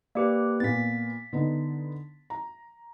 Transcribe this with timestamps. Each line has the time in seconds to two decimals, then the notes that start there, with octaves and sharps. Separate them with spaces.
0.15 A#3 G4 B4 D5
0.60 A#2 B3 A6 B6
1.33 D3 B3 D#4
2.30 A#5